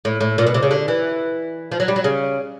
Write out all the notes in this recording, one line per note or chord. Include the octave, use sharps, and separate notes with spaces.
A2
A2
A#2
B2
C3
C#3
D3
E3
F3
F#3
G3
F#3
C#3